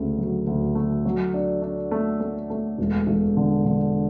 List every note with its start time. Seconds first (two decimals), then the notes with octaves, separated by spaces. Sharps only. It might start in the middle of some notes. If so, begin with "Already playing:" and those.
Already playing: D2 C#3 A3
0.18 F#3
0.47 D2
0.75 A3
1.05 F#3
1.34 D4
1.62 D4
1.91 A3
2.20 A3
2.50 A3
2.78 E1
3.07 E1
3.37 D3
3.65 D3